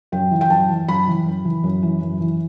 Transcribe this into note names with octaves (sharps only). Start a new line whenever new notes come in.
F#2 G5
E3
G5
F#2 A5
E3
F#2 B5
E3
F#2
E3
F#2
E3
F#2
E3